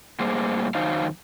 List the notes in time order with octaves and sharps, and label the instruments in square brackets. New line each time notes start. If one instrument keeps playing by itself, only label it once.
[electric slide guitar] A2 G3 A#3 G#4 C5
F2 D#3 F#3 D#4 C5 F5